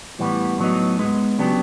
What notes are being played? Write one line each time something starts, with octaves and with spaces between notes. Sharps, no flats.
A2 E3 G3 B3
A2 F#3 B3 D#4
G#3 B3 D#4
C#3 F#3 B3 D4 G4